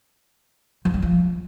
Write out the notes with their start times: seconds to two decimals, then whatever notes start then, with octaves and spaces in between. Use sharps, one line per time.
0.85 F3
0.94 G3
1.02 F3